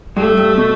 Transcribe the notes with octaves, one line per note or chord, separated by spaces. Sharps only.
G2 A3
G2
B2